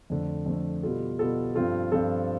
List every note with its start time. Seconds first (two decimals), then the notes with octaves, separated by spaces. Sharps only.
0.10 F2 D3 A3
0.46 F2 D3 A3
0.83 B2 G3 B3 F4 A4
1.19 B2 G3 B3 F4 A4
1.55 G2 F3 C4 F4 A4
1.91 G2 F3 C4 F4 A4